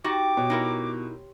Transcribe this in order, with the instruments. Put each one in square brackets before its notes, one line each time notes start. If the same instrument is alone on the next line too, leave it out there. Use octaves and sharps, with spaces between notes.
[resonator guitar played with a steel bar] D#4 F#4 [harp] G4 A6 E7 [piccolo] D6
[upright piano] B2 [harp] C#5
[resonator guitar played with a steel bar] D#4 E4 A#4 [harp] C6